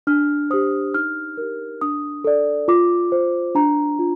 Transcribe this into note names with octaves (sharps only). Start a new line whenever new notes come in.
D4 F6
G4 C5 D#6
D#4 F6
G4 A#4
D4 D#6
A4 D5
F4 D6
C5
D4 A#5
F4